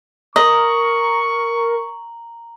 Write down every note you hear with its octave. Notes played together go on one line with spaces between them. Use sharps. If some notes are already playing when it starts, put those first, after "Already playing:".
A#4 D#5 A#5 C#6 F#7